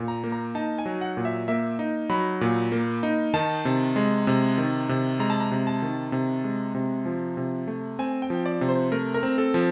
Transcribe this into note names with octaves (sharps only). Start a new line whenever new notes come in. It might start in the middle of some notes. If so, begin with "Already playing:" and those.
Already playing: A#2
A#5
A#3
A#5
D#4 A5
G#5
F#3
F#5
A#2
E5
A#3 E5
D#4
F#3 B5
A#2
A#3
D#4
D#3 A5
C3
G#3
C3
D#3
C3
G#3 A#5
A5
A#5
C3
A5
D#3
C3
G#3
C3
F3
C3
A3
C4 G#5
G5
F3
D5
C3
C5
A3 A#4
A#4
C4
A4
F3